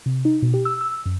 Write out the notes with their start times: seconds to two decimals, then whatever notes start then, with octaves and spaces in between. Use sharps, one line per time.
0.06 C3
0.25 D#4
0.42 B2
0.54 G4
0.65 E6
0.81 E6
1.05 F#2